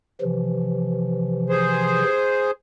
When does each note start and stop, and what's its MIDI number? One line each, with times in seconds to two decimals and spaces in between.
0.21 2.03 48
0.21 2.03 52
0.21 2.03 53
1.49 2.51 68
1.49 2.51 72